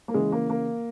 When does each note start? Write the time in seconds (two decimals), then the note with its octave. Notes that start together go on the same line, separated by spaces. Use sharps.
0.08 A#3
0.14 C#3 E3 G#3
0.32 A#3
0.50 A#3